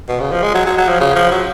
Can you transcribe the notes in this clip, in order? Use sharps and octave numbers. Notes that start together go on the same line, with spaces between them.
B2
C#3
F3
G#3
F#3
F#3
F#3
F3
C#3
F3
F#3